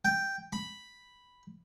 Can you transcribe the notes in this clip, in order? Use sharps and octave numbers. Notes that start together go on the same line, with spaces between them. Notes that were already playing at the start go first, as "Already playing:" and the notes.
G5
B5